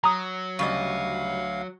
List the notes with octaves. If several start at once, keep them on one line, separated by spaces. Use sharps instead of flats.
F#3 A#5 D#6
D2 C#3 G3 D#5 F5